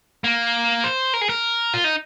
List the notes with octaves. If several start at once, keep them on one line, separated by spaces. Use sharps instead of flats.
A#3
C5
A#4
G#4
A#4
F4
D#4